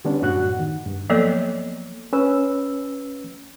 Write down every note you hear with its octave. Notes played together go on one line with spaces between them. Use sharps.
D3 G3 B3 C#4 D4
F#2 A2 F#4 F#5 F#6
D#3
G2
F3 F#3 A#3 B3 A4 C#5
C#4 B4 E6